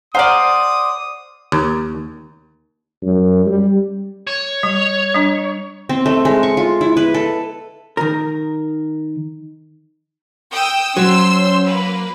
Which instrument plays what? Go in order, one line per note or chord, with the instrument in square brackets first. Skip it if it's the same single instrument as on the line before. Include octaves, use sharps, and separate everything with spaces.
[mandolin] C5 D5 [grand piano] F#5 A#5 F6 [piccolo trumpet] D#6
[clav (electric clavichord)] D#2
[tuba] F#2
G3
[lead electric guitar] C#5
[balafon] G3
G3 D4
[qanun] C4
A3
G#3
C#6
F4
E4
B4
A4
[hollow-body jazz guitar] D#3 A#4
[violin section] G5 D#6 E6
[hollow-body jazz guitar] F#3 [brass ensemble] C#4 C5 [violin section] C6 E6
[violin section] A#3 B4